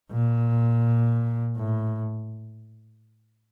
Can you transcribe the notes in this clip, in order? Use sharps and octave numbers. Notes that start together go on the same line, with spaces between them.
A#2
A2